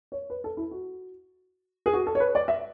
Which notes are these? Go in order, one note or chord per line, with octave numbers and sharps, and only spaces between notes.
C#5
B4
A4
E4
F#4
G#4
F#4
A4
C#5
B4
D5
E5